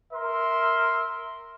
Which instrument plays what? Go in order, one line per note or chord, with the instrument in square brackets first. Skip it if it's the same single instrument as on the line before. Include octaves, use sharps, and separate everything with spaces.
[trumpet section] A#4 E5 C6